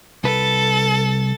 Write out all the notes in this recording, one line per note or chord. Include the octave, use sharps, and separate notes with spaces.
C2 A4 B4 A6